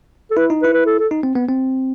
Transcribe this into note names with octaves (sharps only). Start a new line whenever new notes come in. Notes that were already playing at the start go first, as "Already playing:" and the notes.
A4
E4 B4
D#4
E4 B4
B4
A4
A4
D#4
C4
B3
C4